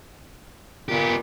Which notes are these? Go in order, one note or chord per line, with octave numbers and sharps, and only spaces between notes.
A#2 B3 G4